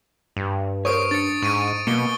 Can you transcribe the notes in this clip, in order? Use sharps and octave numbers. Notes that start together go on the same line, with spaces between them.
G2
A#4 C5 C#5 C#6 D#6 D7
D4 A6 C#7
G#2 C#6 D#7
B2 A#3 C#7 G7